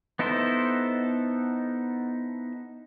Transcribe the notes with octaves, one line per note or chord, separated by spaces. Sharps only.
B3 D#4 E4 A4 C5